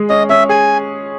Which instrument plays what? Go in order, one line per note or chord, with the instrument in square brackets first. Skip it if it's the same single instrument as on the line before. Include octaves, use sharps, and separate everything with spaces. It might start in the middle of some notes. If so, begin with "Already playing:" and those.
Already playing: [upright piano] G#3 G#4
[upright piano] C#4 [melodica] D#5
[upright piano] C#4 [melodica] E5
[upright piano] G#4 [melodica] G#5